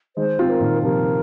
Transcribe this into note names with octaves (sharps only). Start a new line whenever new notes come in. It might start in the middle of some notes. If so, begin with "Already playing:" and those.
D#3 G#3 C5
C4 F4
A#4
A#2 D#3
C3 F3 A#4